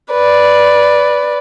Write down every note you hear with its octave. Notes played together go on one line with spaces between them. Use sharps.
B4 D5